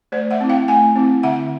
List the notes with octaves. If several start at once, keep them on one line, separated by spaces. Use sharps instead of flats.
A3 C5 D5
E5 F#5
C4 E4
F5 G5
A3 F#5 G#5
C4 E4
D3 E5 F#5